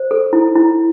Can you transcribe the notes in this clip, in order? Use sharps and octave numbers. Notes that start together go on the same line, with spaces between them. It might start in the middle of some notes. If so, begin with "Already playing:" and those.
Already playing: C5
A4
E4
E4